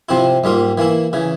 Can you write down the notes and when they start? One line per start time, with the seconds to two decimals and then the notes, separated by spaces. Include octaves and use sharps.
0.09 C3 F3 C4 E4
0.44 G#2 G3 A#3 F4
0.78 E3 A#3 E4
1.13 C#3 E3